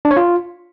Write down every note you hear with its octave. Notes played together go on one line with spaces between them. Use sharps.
D4
C#5
F4